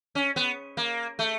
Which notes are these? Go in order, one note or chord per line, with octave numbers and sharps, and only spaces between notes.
C#4
B3
A#3
A3